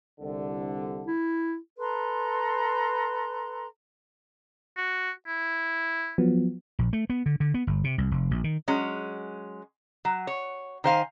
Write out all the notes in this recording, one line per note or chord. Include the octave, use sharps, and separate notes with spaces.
C2 D3
E4
A4 B4 A#5 C6
F#4
E4
F3 F#3 B3
A#1
A3
B3
D3
D3
B3
G1
C3
C2
F1
A#1
D#3
F#3 G#3 C#4
F#3
C#5
D#3 C5 F5 G#5